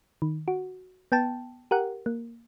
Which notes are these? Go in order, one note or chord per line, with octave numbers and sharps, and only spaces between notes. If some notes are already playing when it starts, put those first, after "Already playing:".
D#3
F#4
B3 G5 A5
G4 A#4 F#5
A#3